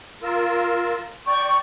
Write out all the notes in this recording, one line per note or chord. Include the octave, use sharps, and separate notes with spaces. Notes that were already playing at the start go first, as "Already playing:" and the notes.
F4 A#4 E6
D5 G5 C#6